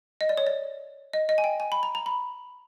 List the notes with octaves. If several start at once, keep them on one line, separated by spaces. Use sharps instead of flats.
D#5
D5
C#5
D5
D#5
D#5
G#5
G5
G#5
B5
A#5
A#5
B5